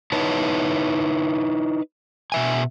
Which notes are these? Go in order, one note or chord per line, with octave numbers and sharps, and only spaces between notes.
D#4 E4 B4 C#5 A5
B2 E5 G#5